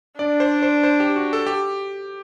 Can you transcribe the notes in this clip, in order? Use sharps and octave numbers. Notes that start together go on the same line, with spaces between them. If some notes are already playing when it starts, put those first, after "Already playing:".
D4 D5
C5
C5
C5
G4
F#4
A4
G4